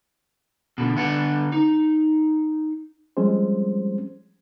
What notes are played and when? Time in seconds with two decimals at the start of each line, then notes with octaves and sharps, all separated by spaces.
0.78 B2 D3
0.96 D3 B3 D4 F#5
1.52 D#4
3.17 F3 G3 G#3 C4 C#4 C5